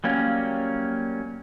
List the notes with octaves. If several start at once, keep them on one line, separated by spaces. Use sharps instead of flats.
F#3 G3 A#3 C#4